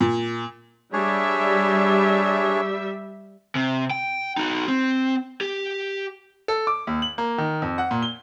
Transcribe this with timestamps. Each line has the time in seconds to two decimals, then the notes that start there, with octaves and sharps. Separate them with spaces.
0.01 A#2
0.93 G3 D4 G#4 C#5 E5
3.55 C3
3.90 G5
4.37 D#4 F#4
4.68 C4
5.41 G4
6.48 A4
6.67 D6
6.87 D#2
7.02 F#7
7.18 A#3
7.38 D#3
7.62 F2
7.78 F#5
7.91 A#2
8.02 G7